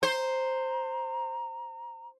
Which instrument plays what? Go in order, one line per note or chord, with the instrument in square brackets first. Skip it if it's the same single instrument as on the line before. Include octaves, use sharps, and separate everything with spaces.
[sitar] C5 [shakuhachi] A#5